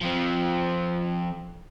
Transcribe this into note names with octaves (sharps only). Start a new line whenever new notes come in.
F3 C4